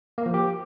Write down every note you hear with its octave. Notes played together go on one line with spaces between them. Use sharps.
A#3
F3
G4